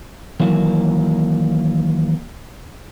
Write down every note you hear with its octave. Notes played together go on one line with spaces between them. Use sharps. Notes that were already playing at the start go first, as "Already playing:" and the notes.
D#2 E3 F#3 A#3